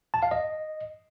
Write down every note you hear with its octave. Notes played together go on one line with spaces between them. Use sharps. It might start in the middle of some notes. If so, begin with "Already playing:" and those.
A5
F5
D#5